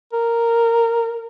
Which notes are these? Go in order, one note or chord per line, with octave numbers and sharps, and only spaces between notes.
A#4